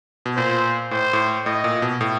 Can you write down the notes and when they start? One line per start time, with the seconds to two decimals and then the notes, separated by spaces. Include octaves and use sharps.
0.26 B2
0.36 A#2 C5
0.91 A2 C5
1.13 A2
1.45 A2 D#5
1.64 A#2
1.82 B2
2.01 A2